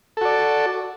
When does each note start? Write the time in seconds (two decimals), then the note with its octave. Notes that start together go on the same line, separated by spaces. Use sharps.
0.17 A4
0.21 F#4
0.25 D5